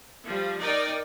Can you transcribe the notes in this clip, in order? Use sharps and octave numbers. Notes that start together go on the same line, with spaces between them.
F3 G3
D#4 A#4 D5 G5